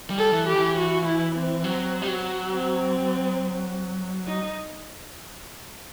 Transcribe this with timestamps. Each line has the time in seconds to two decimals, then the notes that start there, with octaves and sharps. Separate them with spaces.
0.10 G3
0.18 A4
0.32 E3
0.47 G4
0.55 E3
0.77 F#4
1.06 E4
1.35 C4
1.64 F#3
2.02 G3
2.08 F#3
2.51 C4
4.27 D#4